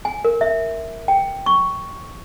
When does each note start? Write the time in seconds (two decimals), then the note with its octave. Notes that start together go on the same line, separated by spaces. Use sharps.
0.05 G#5
0.25 A#4
0.41 E5
1.08 G5
1.46 C#6